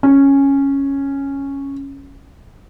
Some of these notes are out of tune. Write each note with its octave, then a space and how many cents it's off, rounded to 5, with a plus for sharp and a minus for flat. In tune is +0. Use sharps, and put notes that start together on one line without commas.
C#4 -5